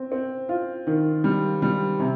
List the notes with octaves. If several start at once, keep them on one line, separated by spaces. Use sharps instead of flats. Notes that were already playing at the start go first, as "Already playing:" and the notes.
Already playing: C4
C4
F4
D#3
G3
G3
C3